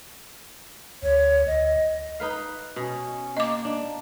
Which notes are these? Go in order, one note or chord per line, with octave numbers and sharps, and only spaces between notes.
D2 C#5
D2 D#5
D#4 B4 F5
B2 C#4
A#3 D#5 D6
D4